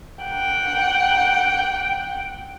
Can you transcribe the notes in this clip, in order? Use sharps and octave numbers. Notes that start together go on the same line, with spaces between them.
F#5 G5